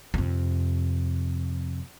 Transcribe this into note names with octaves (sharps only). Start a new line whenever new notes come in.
F2 C3